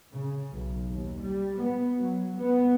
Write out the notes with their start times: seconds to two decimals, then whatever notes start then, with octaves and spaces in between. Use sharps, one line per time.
0.14 C#3
0.52 B1
0.91 D#2
1.21 G3
1.59 B3
2.00 F#3
2.38 B3